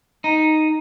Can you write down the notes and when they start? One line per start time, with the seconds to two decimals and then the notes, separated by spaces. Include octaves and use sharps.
0.24 D#4